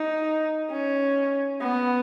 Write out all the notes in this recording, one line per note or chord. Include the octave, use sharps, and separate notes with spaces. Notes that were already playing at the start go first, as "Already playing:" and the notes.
Already playing: D#4
C#4
B3